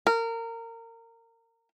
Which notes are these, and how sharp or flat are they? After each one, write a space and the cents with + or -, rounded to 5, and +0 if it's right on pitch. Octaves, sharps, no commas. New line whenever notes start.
A#4 -25